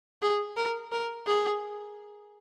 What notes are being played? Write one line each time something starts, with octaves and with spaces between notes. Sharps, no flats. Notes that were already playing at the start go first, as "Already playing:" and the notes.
G#4
A#4
A#4
G#4